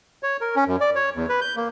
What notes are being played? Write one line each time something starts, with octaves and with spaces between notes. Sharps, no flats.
C#5
A#4
C#4
F#2
D5
C#5
E2
B4
G6
A#3